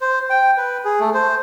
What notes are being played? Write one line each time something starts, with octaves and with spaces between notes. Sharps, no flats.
C5
G5
B4
G#4
A3
C5